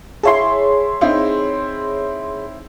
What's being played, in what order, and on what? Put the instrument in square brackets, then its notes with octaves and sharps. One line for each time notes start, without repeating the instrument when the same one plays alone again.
[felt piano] E4 E5 A5 [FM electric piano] G#4 C#5 C6
[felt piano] C4 D#4 E4